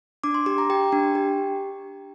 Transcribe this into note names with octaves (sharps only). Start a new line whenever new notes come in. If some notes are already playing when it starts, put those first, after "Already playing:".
D4 D6
C6
G4 D6
A#5
G4 G5
D4
G4